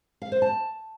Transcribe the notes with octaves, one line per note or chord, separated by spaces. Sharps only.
F5
C5
A5